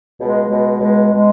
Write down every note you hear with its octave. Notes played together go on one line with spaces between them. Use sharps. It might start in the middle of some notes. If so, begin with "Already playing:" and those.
C#2 B2 G#3
C#2 B2 G#3
C#2 B2 G#3
B2 G#3